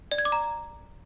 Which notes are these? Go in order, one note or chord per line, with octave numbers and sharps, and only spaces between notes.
D5
G#6
D6
A#5